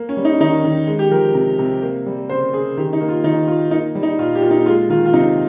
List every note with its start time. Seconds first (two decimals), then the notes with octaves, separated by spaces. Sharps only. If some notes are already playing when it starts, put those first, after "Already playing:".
Already playing: A#3
0.09 C#4
0.17 G3
0.25 D#4
0.40 D#3 D#4
0.65 D#3
0.87 G#3
0.99 G4
1.11 F3 A#4
1.34 C3
1.59 C3
1.82 A#3
2.06 G3
2.29 C#3 C5
2.53 C#3 G#4
2.77 D#3 G4
2.93 D#4
3.01 A#3
3.09 F4
3.24 D#3 D#4
3.47 A#3 F4
3.71 A#3 D#4
3.95 G3
4.03 D#4
4.19 A#2 F4
4.35 G4
4.42 A#2
4.50 D#4
4.66 G#3 F4
4.89 D#3 F4
5.06 F4
5.13 C3 D#4